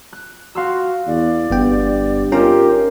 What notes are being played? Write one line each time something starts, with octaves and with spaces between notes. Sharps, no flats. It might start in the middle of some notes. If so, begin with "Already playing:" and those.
F#6
F#4 F5 C6 E6
E2 D5
G1 G2 B3 G5
C#4 D#4 F4 G4 A#4